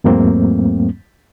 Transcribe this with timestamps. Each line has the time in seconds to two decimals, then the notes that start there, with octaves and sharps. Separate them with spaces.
0.04 E2 G#2 F#3 A3 A#3 C4